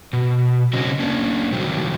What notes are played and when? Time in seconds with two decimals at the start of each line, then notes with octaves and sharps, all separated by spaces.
0.13 B2
0.73 C#3 F#3 C4 C#4 D#5
0.99 A#3 C#4 D4
1.52 C3 D#3 F#3 G3